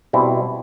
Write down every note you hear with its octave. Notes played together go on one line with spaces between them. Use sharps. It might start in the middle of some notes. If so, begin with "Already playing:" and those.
B2 G3 C4 E4